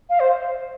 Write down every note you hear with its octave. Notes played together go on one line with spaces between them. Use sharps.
F5
C5